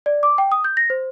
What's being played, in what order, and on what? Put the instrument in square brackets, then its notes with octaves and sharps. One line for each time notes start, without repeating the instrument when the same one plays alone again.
[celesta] D5
D6
G5
D#6
G6
A#6
C5